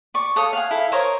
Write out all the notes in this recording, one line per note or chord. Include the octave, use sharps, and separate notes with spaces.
D5 C#6
A4 C#5 F5 D#6
F5 F#5 G#5
E4 A4 F5
A#4 C5 C#5 D#5